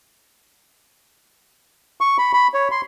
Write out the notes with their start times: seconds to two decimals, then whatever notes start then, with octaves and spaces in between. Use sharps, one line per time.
2.01 C#6
2.18 B5
2.34 B5
2.54 C#5
2.71 C6